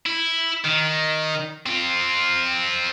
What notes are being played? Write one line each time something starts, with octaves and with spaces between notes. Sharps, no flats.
E4
D#3
C4 F4